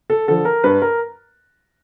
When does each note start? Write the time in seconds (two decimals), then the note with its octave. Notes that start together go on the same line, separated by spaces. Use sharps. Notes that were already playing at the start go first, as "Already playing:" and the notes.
0.10 A4
0.28 D3 F3 A4
0.45 A#4
0.64 G2 B4
0.82 A#4